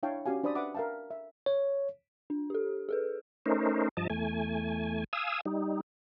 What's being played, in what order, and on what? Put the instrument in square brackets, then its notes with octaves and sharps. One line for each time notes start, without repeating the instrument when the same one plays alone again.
[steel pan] D4 E4 C#5 F5 G5 A5
C#4 F#4 G4 F5 G#5
D4 C5 D5 B5 D#6
B4 E5 F#5 B5 D6 D#6
A#4 E5 F5 G5 A5
E5
[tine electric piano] C#5
[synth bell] D4
G4 A4
G#4 A4 B4
[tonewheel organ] A3 C#4 D#4 A#4 C5
G2 F3 D#5 A5
E2 A3 G#5
F5 G#5 D#6 E6
G3 D#4